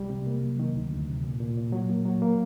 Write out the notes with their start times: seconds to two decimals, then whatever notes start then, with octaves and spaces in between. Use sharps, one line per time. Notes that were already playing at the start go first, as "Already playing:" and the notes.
Already playing: C2 G3
0.10 C3
0.27 A#3
0.43 F#3
0.59 D#3
0.75 D2
0.91 D2
1.08 C3
1.24 A#2
1.40 A#2
1.57 A#2
1.72 F#3
1.90 A#3
2.05 F#3
2.22 A#3